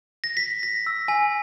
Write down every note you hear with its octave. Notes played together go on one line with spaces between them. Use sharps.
A#6
B6
A#6
E6
G#5